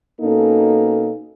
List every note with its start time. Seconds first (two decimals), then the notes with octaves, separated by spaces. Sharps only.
0.21 B2 A#3 C#4 D#4 A4